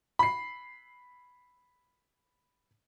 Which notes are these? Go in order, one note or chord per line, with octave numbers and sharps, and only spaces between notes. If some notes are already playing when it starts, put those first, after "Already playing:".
B5 C7